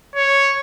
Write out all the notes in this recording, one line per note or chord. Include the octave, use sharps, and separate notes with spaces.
C#5